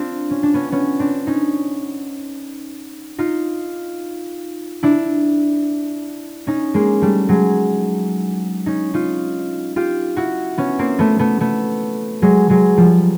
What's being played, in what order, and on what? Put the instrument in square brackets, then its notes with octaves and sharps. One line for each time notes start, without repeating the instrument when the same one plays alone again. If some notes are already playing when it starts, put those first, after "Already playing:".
Already playing: [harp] C4 D4 F4
C#4
D4
B3 C#4
B3 C#4
C4 D4
C#4 D#4
D#4 F4
D4 E4
C#4 D#4
G#3 A#3
G3 A3
F#3 G#3
C#4 D#4
D#4 F4
F4 G4
E4 F#4
B3 C#4
A#3 C4
A3 B3
A3 B3
A3 B3
F#3 G#3
F#3 G#3
F3 G3